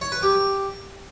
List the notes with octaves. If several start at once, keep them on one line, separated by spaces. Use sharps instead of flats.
C#5
B4
G4